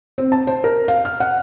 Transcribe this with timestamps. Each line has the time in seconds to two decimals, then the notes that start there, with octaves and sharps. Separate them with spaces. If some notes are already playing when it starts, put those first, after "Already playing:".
0.18 C4
0.32 A5
0.47 C5
0.64 A#4
0.88 F5
1.05 F6
1.20 F#5